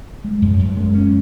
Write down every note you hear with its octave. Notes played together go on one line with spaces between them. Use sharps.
G#3
F#2
F#2
G#3
C#4